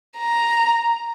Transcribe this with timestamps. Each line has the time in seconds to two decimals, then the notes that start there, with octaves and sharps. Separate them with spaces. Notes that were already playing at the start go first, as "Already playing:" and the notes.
0.18 A#5